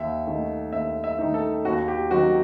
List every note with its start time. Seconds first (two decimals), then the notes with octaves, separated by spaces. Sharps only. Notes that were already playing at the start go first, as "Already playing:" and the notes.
Already playing: D#2 E5
0.27 D#3 A3 D#4
0.73 D#2 E5
1.04 E5
1.18 D#3 A3 D#4
1.34 A4
1.65 D#2 F#4
1.88 G4
2.10 D#3 F#3 C4 F#4